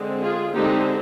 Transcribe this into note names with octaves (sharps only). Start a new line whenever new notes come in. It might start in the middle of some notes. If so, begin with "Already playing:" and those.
Already playing: D3 G#3 C4
F4 G#4
D3 G#3 C4 D#4 G4